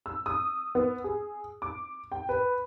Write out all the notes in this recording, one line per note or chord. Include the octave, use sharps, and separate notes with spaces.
E6
D#6
B3
G#4
D6
G5
B4